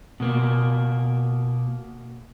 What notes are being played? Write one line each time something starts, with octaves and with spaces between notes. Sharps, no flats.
B2 A#3